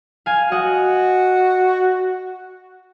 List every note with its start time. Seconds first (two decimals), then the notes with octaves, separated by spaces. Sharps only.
0.26 F5 G#5
0.52 F#4 D#5 F#5